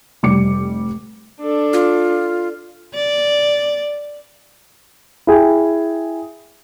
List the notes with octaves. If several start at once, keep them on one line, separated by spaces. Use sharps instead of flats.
F1 G3 D6 C#7
D4 A4
F4
D5
E4 G#4 G5